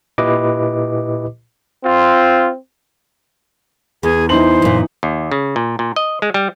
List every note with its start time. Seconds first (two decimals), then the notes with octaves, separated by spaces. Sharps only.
0.18 A#2 E4 G4 B4 D#5 D6
1.85 C4 F4
4.03 E2 G#4
4.29 E3 D#4 C5 F#7
4.62 F#2 A#2
5.03 D#2
5.32 C#3
5.56 A#2
5.79 A#2
5.96 D#5
6.22 G#3
6.34 G3